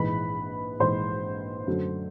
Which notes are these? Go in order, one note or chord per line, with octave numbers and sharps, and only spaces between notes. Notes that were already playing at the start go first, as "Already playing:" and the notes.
Already playing: A#1 G#2 E3 G#3 B4 B5
A#1 G#2 E3 G#3 C5 C6
F#2 D3 F#3 A3